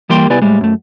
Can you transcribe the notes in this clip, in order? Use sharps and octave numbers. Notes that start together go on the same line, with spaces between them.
E3 G3 A#3 G4 G5 C6
C2 B3 E4 G4 D5 G#5
A2 G3 G#3
F#2 A3